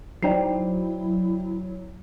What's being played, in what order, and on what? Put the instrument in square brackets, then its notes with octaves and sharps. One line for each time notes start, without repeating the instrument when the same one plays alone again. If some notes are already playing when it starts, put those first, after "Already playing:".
[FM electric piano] F#3 [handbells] D#4 C7 [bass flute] E4 [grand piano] C5 D5 G5